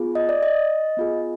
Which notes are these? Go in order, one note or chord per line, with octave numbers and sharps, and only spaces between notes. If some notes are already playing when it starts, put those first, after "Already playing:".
Already playing: B3 F4 G#4
D#5
D5
D#5
B3 F4 G#4